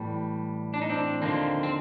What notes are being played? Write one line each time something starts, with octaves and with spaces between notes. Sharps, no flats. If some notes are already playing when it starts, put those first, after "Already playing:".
Already playing: A2 E3 G3
D4
D#4
C4 D4
D#2 D3 F3 A#3 C4
C4